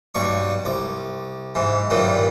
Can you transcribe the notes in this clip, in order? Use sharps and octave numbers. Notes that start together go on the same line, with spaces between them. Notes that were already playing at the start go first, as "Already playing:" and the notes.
B1 G2 D5 C#6
C2 D6
G#2 E3
G2 A#2 D#3 E3 F#3